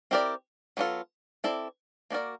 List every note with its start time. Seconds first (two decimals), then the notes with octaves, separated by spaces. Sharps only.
0.11 C4 E4 G4 A#4 D5
0.77 F#3 B3 D4 F4 A4
1.44 C4 E4 A4 D5
2.10 A#3 D4 F#4 A#4 D5